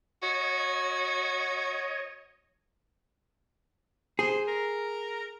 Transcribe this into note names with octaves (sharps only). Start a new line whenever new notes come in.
F#4 C#5 D#5
G#4 C5
A#4